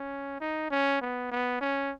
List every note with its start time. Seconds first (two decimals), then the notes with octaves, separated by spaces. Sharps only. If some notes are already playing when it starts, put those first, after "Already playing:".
Already playing: C#4
0.41 D#4
0.71 C#4
1.01 B3
1.31 B3
1.61 C#4